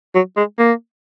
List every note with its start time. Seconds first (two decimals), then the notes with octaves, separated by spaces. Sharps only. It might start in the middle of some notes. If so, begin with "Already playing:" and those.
0.15 F#3
0.37 G#3
0.59 A#3